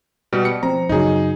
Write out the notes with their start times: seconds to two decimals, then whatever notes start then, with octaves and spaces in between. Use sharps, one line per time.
0.32 B2 G3
0.45 C#7
0.63 F3 C4 A#5
0.89 F#2 C#3 F#3 D#4 G#4